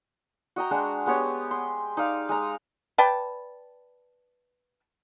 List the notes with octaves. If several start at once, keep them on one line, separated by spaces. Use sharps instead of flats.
F#4 D#5 G5 A#5
G#3 D4 F#4
G#3 B3 G4 C#5
C6
D#4 D5 F5
G#3 A#5
B4 D5 G5 A5